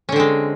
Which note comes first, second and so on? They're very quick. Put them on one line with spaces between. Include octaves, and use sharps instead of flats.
C#4 D3 C4 G#3